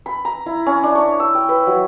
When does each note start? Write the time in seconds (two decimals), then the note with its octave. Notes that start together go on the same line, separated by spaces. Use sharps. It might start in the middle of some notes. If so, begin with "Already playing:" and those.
0.06 B5
0.25 A#5
0.46 E4
0.66 C#4
0.84 D4
0.95 C#5
1.20 E6
1.35 G5
1.49 B4
1.67 F#3